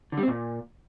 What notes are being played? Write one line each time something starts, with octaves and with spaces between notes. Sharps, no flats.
D3
G3
C4
A#2